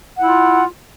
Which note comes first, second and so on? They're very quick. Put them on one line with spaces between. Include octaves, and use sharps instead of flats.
F#5 E4 F4